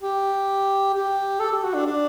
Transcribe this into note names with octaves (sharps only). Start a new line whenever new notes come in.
G4
G4
A4
G4
F#4
D4
D4